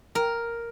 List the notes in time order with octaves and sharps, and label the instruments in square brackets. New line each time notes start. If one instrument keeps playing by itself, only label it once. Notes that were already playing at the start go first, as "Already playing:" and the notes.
[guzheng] A#4